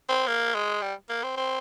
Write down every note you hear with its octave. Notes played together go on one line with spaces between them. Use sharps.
C4
A#3
G#3
G3
A#3
C4
C4